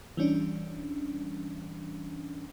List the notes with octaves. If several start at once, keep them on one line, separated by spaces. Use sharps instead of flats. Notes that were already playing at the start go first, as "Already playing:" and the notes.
E3 G3 C#4 D4